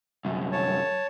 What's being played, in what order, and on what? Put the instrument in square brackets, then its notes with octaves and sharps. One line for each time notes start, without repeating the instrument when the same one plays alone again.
[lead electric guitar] C2 F#2
[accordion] C#5 A5